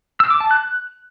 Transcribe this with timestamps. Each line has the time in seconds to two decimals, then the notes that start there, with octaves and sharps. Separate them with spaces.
0.20 E6
0.30 D6
0.40 A5
0.51 F#6